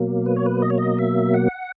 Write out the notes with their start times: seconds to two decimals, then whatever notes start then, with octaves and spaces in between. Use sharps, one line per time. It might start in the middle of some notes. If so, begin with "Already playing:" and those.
Already playing: B2 F#3 A#3
0.26 B4
0.36 C#5
0.46 B4
0.62 D#5
0.70 C#5
0.78 D#5
0.99 E5
1.34 F#5